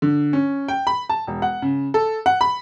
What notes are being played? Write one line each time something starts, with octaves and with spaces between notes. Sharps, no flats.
D3
C#4
G5
B5
A5
E1
F#5
C#3
A4
F#5
B5